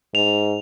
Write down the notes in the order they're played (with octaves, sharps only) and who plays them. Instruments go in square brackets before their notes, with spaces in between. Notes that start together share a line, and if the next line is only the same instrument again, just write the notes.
[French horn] G#2 [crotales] F7